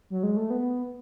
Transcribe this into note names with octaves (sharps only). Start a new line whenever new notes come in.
F#3
G#3
A3
B3